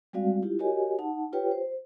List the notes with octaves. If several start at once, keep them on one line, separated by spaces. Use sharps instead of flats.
G3 G#3 C4 F#4 D5 F5
E4 F4 G4
F#4 G4 A#4 C#5 D#5 G#5
D#4 F#5 A5
F4 G4 B4 C#5 G5
C5